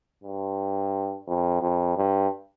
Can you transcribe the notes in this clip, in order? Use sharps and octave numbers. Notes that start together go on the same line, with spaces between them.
G2
F2
F2
G2